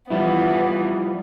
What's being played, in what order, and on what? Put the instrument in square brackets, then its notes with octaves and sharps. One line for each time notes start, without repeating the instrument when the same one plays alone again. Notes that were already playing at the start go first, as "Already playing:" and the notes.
[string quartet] E3 B3 [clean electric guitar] F3 G3 E4